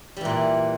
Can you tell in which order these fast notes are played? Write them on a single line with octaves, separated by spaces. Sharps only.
G3 E3 A#2